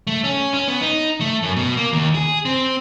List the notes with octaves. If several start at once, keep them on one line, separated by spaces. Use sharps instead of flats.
A3
C#4
C#4
B3
D#4
A3
F#2
B2
A#3
D#2
G#4
C4